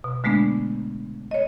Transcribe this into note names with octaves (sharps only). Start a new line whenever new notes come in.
B2
D3 G#3 A3 B3 D4
C#5 D#5